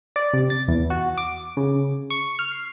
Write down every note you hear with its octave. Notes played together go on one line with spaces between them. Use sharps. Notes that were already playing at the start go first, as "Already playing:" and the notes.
D5
C3
A6
E2
F#4
D6
C#3
C#6
F6
C7